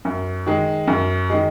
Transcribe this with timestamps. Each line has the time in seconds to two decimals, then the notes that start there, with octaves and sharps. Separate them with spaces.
0.05 F#2
0.47 D#3 G#3
0.88 F#2
1.30 D#3 G#3